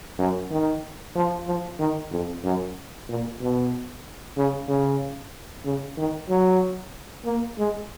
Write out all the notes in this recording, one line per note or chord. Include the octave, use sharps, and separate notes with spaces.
F#2
D#3
F3
F3
D#3
F2
F#2
A#2
B2
C#3
C#3
C#3
D#3
F#3
A#3
G#3